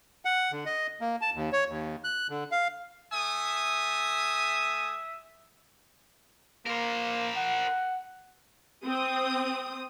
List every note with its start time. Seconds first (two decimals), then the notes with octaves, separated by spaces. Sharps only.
0.25 F#5
0.52 D3
0.66 D#5
1.01 A#3
1.21 A5
1.34 D#2
1.52 C#5
1.68 D#2
2.04 F#6
2.30 D3
2.51 F5
3.13 A3 E5 G#5 D#6
6.66 A#3 A#4 C5
7.36 F#5
8.84 C4 D#6